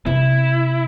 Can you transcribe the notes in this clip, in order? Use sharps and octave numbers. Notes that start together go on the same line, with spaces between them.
C3 E4